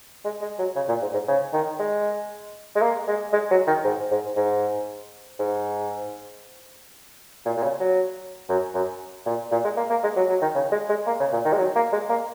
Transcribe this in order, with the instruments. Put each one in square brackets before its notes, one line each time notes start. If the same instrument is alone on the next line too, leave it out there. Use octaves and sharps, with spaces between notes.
[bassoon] G#3
G#3
F#3
C#3
A#2
G#2
G#2
C#3
D#3
G#3
G#3
A#3
G#3
G#3
F#3
D#3
G#2
G#2
G#2
G#2
A#2
A#2
C#3
F#3
F#2
F#2
A#2
A#2
G#3
A#3
A#3
G#3
F#3
F#3
D#3
C#3
G#3
G#3
A#3
C#3
A#2
D#3
G#3
F#3
A#3
G#3
A#3